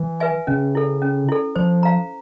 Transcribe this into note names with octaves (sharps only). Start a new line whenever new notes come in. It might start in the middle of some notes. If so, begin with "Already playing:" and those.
Already playing: E3
B4 E5 G#5
C#3 C#4
E4 A4
C#4
E4 A4
F3 C5
F5 A#5